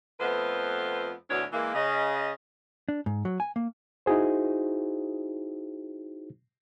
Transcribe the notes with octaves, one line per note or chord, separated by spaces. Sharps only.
F2 A3 B3 B4 C5
D2 B2 E3 D4 C#5
E3 G#3 A#3
C#3 D#5
D4
G#2
F#3
G#5
A#3
D#4 E4 F#4 G#4 C5